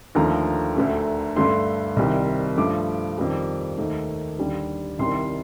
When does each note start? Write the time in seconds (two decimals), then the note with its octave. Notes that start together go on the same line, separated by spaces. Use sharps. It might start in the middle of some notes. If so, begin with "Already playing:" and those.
0.15 D#2 D3 F3 A3 A#5
0.76 D2 D3 A3
1.36 G2 D3 A3 C6
1.96 C2 C3 D#3 G3
2.57 G2 F3 A3 D6
3.18 F2 D#3 G3
3.78 D#2 D#3 A3
4.38 D#2 D3 G3
4.99 C2 C3 D#3 G3 C6